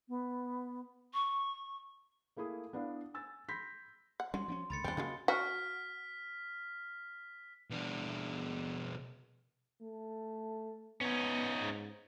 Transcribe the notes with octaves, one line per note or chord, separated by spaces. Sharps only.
B3
C#6
A3 A#3 E4 G#4 D#6
B3 D4 E4 F5
G#5 E6 A6
B5 C6 G6 A#6 B6
F#5
F#3 G3 C#4 C6
F3 C4 C#4
C#2 D3 B5 A6 C#7
E2 E3 G3 C4 D4 G#5 G7
C#3 F#3 G#3 A#3 C#4
F#4 F6 B6
B2 D4
A3
B3 C#4 D#4
G#2